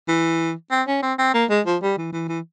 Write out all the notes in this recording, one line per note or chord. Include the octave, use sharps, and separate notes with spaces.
E3
C4
C#4
C4
C4
A#3
G#3
F3
G3
E3
E3
E3